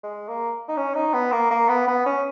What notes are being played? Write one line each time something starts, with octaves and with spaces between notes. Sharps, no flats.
G#3
A#3
D#4
C#4
D#4
B3
A#3
A#3
B3
B3
C#4